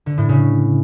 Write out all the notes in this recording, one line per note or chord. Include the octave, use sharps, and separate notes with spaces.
D3
A2
C#3